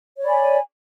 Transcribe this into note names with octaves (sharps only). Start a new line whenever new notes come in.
C#5 D5 G#5 B5